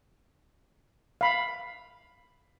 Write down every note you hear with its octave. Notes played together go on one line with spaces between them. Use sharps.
F5 B5